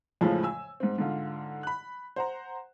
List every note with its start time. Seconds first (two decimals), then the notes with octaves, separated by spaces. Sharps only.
0.21 F2 A2 C#3 F3 G#3 D#4
0.43 G#5 E6
0.80 G#2 C4
0.98 G#2 D3 F4
1.63 B5 F#6
2.16 C5 F#5 A#5